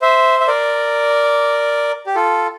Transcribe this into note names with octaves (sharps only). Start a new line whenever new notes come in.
C5 E5
E5
A#4 D5
G4
F4 A4